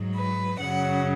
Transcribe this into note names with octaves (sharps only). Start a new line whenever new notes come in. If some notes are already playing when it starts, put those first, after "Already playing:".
Already playing: G#2 F#3
B4
F#2 C#3 F#3 F#5